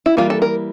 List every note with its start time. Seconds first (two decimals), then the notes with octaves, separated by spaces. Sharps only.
0.06 E4
0.17 E3 G3 A#3 F4
0.30 A4
0.42 A#4